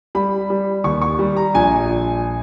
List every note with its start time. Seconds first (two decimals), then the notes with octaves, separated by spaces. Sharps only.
0.15 G3 B5
0.50 G3
0.84 D#2 C#6
1.02 C#6
1.19 G3
1.36 A#5
1.54 A#1 G#5
1.89 A#1